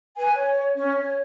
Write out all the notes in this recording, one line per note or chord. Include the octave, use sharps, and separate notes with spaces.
B4 G#5
C#5
C#4
C#5